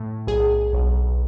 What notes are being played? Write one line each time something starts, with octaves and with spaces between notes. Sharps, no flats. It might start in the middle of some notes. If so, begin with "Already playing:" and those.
Already playing: A2
B1 G#4
B1